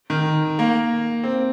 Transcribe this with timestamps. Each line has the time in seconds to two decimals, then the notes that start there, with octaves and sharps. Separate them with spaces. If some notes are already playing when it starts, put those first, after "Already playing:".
0.10 D#3
0.59 A#3
1.24 C4